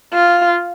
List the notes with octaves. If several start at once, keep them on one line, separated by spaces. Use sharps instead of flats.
F4